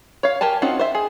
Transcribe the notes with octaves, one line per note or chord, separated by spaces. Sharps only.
C#5 F5
G4 A#4 G#5 A5
C4 C#4 D#4 F4 F#4
C5 E5
G#4